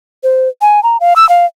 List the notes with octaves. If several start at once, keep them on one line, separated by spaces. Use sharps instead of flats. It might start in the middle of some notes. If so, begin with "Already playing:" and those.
C5
G#5
A#5
F5
E6
F5